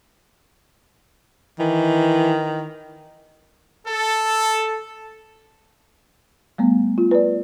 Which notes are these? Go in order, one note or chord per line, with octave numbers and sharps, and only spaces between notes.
D#3 E3
A4
G3 A3 B3
F4
B4 D5